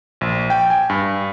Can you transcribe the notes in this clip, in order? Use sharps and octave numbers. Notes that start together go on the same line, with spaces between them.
A#1
G5
G#5
G2